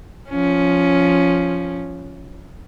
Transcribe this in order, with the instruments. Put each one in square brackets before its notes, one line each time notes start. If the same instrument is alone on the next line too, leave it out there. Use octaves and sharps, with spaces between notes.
[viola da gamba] F3 C#4